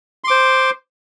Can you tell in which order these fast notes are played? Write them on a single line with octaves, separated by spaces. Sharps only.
C6 D6 C5